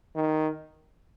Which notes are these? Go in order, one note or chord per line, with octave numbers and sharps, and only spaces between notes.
D#3